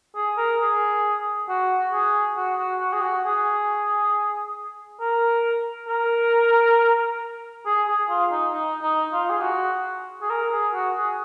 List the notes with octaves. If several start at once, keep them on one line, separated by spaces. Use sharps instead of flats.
G#4
A#4
G#4
F#4
G#4
F#4
F#4
F#4
G#4
F#4
G#4
A#4
A#4
G#4
G#4
F4
D#4
D#4
D#4
F4
G#4
F#4
G#4
A#4
G#4
F#4
G#4